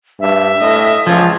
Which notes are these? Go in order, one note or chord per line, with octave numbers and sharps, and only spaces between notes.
G2 E5
A2 D#5
C#2 F3 F4 G#6